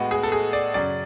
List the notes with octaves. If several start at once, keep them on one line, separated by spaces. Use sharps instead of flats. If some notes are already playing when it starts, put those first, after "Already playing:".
Already playing: A2 G#3 B3 F#4
G#4
A4
G#4
D5
F#2 C#3 F#3 C#4 D5